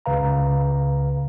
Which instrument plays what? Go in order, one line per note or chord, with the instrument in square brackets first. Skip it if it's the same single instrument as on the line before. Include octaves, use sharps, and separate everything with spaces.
[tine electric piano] C#2 C#3 B4 F5 A#5